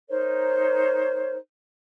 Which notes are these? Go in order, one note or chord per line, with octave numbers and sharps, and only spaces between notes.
D#4 A#4 C5 C#5